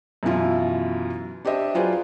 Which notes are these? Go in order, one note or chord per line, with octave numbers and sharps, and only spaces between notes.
F#2 B2 E3 E4 F4
D4 G4 C5 D#5 E5
F#3 F4 G#4 B4 C5 D5